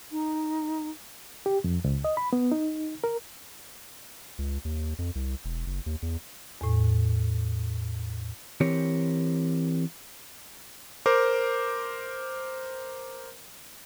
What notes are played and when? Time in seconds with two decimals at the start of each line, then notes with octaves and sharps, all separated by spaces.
0.12 D#4
1.46 G4
1.64 F2
1.84 C#2
2.04 D#5
2.17 B5
2.33 B3
2.52 D#4
3.04 A#4
4.38 C#2
4.65 D#2
4.98 F2
5.15 C2
5.45 E1
5.66 F#1
5.86 D#2
6.02 E2
6.61 E2 A2
8.61 E3 C4 G4 A#4 C#5
11.06 A#4 C5 D6